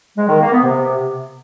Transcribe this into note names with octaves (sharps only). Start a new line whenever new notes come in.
G#3
D#3
A#3
B3
C3